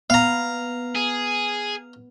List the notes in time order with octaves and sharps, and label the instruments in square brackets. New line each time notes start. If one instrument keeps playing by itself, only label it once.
[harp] B3 [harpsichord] F5 A#5
[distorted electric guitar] G#4